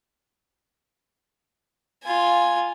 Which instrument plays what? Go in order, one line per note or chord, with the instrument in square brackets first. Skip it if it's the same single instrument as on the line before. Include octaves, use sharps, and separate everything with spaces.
[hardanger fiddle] F4 G#5